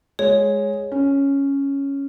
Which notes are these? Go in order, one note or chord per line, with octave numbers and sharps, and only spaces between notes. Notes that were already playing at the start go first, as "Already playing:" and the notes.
G#3 C#5
C#4